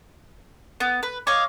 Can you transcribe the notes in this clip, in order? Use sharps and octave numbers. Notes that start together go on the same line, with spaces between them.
B3
B4
C#5 D#5 F5 D6